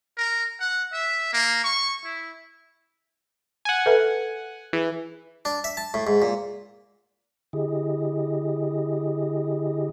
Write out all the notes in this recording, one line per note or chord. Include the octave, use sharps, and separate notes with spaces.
A#4
F#5
E5
A#3
C#6
E4
F#5 G#5
A4 B4 E5
E3 G#4
D4
E5
A5
A2
G#2
A#2
D3 E4 G4 G#4 D#5